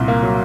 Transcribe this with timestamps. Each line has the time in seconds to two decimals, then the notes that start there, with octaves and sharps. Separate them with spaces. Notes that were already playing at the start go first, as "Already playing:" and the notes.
Already playing: C2 A#2
0.08 A#3
0.23 F#3